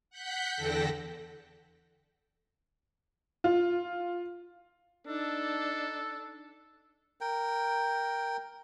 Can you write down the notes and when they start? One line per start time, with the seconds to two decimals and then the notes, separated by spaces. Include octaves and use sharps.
0.10 F#5 F#6 G6 B6
0.55 E2 D3 A4 G5 A#6
3.44 F4
5.07 D4 D#4 A4
7.21 A#4 G5